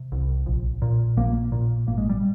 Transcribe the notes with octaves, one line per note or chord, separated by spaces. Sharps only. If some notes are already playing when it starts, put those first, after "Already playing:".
Already playing: C3
C2
A#1
A#2
A#1 A#3
A#2
G#1 A#3
G#3
G3